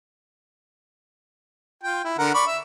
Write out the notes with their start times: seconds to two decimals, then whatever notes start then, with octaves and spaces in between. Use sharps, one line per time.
1.83 F4 G5
2.05 E4
2.18 D3 A#4 F#5
2.34 D5 B5 C#6
2.47 E5